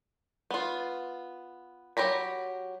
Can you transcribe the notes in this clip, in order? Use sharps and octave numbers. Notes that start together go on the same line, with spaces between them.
B3 F4
F#3 G4 A#5 B5